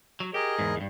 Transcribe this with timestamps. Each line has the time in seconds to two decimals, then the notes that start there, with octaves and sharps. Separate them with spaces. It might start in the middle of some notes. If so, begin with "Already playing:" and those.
0.20 F#3
0.34 G4 G#4 A#4 D#5
0.59 E2 G#2
0.76 E2 G2